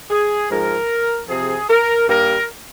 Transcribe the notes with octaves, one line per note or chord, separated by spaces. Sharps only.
G#4
G#2 F3 G#3 A#4
C3 F3 C4 G#4
A#4
G2 G3 A#3 A#4